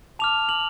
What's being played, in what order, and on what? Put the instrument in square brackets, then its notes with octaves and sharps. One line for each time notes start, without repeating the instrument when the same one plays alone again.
[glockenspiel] A5 D6 F6 F7
F#7